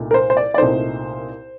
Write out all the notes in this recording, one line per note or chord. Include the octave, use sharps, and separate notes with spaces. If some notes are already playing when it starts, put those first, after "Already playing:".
Already playing: C2 A#2 A3 D#4
A#4
C5
C5
D5
D5
C2 A#2 A3 D#4 C5